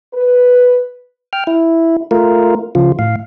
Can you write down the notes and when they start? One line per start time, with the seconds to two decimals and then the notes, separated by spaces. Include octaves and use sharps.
0.13 B4
1.33 G5 F6
1.47 E4
2.11 A3 F4 A#4
2.75 C#3 F3 F4
2.99 A2 F5